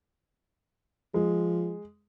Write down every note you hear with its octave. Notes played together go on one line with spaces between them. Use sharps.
F3 G#3